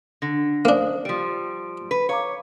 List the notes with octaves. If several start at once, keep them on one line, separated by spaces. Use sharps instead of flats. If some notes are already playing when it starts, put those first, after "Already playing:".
D3 A#6
A#3 D4 C5 F5 D#6
F3 G3 D7
B4
C#5 F5 A#5 D6